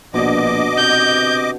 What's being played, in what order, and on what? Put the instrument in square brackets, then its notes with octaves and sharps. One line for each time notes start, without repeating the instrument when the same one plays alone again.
[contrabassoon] A#1 [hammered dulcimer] B2 D3 [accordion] D#5 D6
[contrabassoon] C3 [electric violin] G6